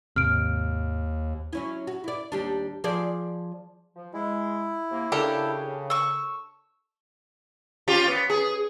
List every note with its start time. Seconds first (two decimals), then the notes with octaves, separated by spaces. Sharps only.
0.16 G#1 D#2 C3 F6 D7
1.53 F#3 C#4 E4
1.87 F#4
2.04 E4 D5
2.32 D#2 G3 D4
2.84 F3 G#4 D5
3.96 F3
4.14 G#3 E4
4.91 C3 A#3
5.12 C#3 D4 G4 A4 A#4
5.90 C#6 E6
7.88 C#4 F4 G4
8.08 B3
8.30 G#4